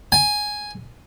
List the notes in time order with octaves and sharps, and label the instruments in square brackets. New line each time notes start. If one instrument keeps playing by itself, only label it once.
[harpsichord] G#5